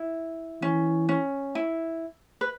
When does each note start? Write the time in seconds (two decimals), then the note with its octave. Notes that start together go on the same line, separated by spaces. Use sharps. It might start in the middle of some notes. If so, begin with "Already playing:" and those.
Already playing: E4
0.61 E3 C#4
1.09 C#4
1.55 E4
2.41 B4